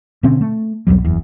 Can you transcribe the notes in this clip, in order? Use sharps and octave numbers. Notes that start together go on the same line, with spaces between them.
B2 D3 C4 C#4
A3
B1 E2 F#3 G3
F#1 E2